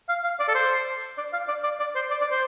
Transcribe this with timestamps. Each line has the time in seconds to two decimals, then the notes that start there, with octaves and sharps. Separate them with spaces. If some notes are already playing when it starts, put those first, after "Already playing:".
0.09 F5
0.24 F5
0.40 D5
0.48 A4
0.55 C5
1.18 D5
1.33 F5
1.48 D5
1.63 D5
1.80 D5
1.95 C5
2.11 D5
2.21 D5
2.31 C5